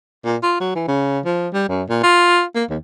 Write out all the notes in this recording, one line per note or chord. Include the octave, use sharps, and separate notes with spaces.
A#2
F4
F#3
E3
C#3
F3
G3
F#2
A#2
F4
A#3
D#2